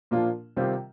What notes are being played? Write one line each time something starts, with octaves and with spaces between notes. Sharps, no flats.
A#2 F3 A#3 D4 F4
C3 D#3 G3 C4 F4